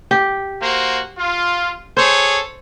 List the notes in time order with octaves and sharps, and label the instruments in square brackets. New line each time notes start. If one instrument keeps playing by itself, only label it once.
[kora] G4
[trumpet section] A#3 F#4 C5
F4
[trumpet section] G#4 A4 C#5 [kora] C5